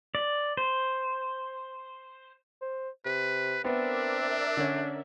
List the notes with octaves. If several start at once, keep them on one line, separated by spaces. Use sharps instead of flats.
D5
C5
C5
C3 B4
B3 C4 D4 A#4 D5 E5
D3 C#4